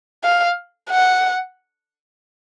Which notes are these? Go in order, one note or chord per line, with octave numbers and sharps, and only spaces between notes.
F5
F#5